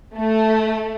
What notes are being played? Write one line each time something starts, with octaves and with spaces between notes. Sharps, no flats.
A3